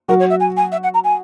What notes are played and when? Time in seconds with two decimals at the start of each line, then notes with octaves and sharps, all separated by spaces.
0.08 F#3 F#4 A#4
0.20 C#5
0.30 E5
0.40 G#5
0.57 G#5
0.72 E5
0.84 F#5
0.94 A#5
1.04 G#5